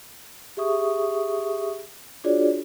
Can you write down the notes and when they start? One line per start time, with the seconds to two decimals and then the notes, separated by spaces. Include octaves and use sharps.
0.57 G4 G#4 E5 C#6 D#6
2.24 D4 F4 F#4 G#4 C#5 D5